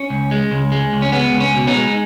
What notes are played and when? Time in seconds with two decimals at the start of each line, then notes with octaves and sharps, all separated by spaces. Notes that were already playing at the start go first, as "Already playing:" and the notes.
Already playing: C#4
0.10 C#2
0.31 G#3
0.51 C#2
0.72 G#3
0.93 C#2
1.02 C#4
1.12 G#3 B3
1.33 C#2
1.40 C#4
1.54 B2
1.67 B3 D#4
1.74 G#3